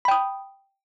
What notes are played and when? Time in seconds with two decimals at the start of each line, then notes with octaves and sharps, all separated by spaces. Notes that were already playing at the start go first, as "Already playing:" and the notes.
0.05 B5
0.08 G5
0.11 D#6